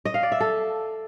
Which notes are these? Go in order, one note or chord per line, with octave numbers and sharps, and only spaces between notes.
D#5
F5
D5
E5
A4